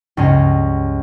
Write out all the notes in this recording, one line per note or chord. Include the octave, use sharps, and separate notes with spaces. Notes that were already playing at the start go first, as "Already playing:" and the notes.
C#2 G2 C#4 A#6